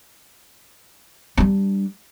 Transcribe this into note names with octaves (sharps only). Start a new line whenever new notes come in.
G3 D4